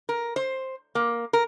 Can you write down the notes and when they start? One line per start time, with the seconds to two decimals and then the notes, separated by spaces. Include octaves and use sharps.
0.09 A#4
0.36 C5
0.95 A#3
1.33 A#4